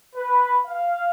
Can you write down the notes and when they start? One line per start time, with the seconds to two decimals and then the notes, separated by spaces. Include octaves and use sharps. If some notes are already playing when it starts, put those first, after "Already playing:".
0.15 B4
0.66 F5